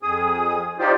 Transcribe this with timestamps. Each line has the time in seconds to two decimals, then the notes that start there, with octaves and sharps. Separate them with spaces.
0.03 F2 G#4 D#6
0.79 D#4 F4 G4 C5 D5